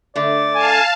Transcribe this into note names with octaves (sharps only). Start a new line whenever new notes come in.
D3 A3 D5
F5 G#5 A5